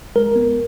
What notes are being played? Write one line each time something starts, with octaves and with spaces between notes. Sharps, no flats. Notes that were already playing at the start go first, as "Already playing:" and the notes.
G#3 A#4
B3